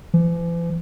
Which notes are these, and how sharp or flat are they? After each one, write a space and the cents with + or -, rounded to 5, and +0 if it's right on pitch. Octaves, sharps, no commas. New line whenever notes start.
E3 +45